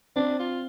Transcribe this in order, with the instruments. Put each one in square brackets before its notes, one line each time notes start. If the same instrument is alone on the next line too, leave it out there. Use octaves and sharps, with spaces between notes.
[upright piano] C4 [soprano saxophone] D4
[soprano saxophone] F4